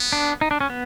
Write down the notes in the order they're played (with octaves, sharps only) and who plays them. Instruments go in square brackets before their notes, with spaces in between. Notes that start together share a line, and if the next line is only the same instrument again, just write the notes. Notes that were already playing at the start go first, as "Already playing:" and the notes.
Already playing: [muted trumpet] B3
[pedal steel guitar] D4
D#4
D4
C#4
B3